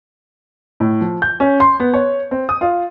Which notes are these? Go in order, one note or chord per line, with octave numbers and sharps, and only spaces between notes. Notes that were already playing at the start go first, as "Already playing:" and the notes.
A2
F3
G6
C#4
C6
B3
C#5
C4
D#6
F4